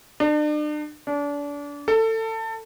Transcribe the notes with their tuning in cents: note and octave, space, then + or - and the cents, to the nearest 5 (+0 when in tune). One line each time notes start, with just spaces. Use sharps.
D4 +40
D4 -30
A4 +25